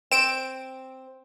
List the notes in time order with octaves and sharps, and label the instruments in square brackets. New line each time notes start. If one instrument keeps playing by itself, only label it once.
[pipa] C4 [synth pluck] D7 E7